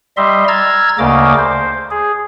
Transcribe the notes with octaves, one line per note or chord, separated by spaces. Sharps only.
G3 D#5 E5 C6
A#5 E6 F6 G#6 A6
D2 C#3 A#3 D#5 D6
C5
G#4